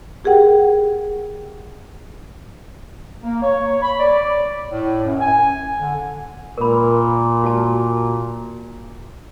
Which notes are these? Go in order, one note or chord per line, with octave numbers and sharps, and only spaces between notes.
G4 G#4 A#4 F#5 G5
A#3
C#5
B5
D5
A2
F#2
G#5
D3
A#2 A#4 B5
F#4 A5